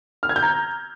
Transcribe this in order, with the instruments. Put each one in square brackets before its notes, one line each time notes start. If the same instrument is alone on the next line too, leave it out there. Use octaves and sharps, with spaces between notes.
[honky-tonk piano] F6
G#6
G6
A#5